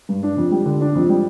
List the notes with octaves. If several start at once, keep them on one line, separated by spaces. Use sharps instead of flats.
G2
D4
F2
G3
D3
D4
F2
G3